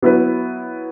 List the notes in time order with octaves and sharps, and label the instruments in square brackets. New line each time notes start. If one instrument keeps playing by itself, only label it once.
[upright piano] F#3 B3 E4 B4